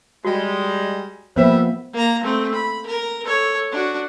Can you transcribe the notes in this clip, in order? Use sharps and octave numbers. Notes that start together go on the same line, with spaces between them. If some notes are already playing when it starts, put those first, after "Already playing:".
G3 G#3 F#4
F3 G3 A#3 B3 B4 C5 E5
A#3 A#5
A3 C4
B5
A#4
A4 C#5
D4 F#4